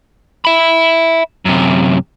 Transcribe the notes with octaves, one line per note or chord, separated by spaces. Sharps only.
E5 B5
F#2 C3